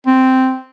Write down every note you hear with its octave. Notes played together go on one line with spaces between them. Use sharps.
C4